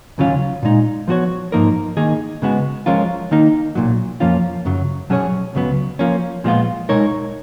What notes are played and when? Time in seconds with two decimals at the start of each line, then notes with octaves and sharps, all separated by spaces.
0.18 D#2 C#3 F#3 C#4 F4
0.62 A#2 G#3 D#4
1.08 F3 B3 F#4 C#5
1.52 G#2 F3 A#3 D#4 A#4
1.97 D#3 A#3 D#4 G#4
2.42 C#3 G#3 B3 F#4
2.86 F3 G#3 C#4 F4 A#4
3.31 D#3 A#3 D#4
3.75 B1 A#2 F#3
4.20 F2 F3 A#3 C#4 F4
4.65 F#2 C#3 F#3
5.09 B2 F#3 C#4 G#4 C#5
5.55 C#2 C#3 F#3 B3
5.99 F3 A#3 C#4
6.44 A#2 F3 G#3 B3 F4
6.89 B2 G#3 D#4 A#4 C#5